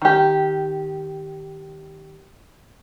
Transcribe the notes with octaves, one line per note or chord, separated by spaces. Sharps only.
D#3 G4